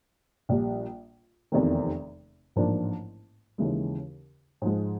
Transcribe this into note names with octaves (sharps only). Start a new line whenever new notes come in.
A#1 A#2 G3
F1 E2 C3 D#3
A1 G#2 F3 A#3 D4
D#2 C#3 E3 G#3
G#2 F3 G#3